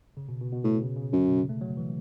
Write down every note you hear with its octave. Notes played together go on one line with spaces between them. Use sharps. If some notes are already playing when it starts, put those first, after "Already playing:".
C#3
B2
B2
B2
A2
C#3
C#3
F#2 D3
B2
C#3
A3
F#3
E3